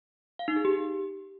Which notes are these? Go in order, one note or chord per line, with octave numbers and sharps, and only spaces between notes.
F5
D#4
G#4
G4